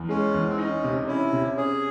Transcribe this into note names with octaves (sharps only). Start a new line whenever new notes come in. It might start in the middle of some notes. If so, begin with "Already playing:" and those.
Already playing: E2
G#3 C#4
E2
C4
C#4 D#4
C3
C#4 E4
C3
C#4 G#4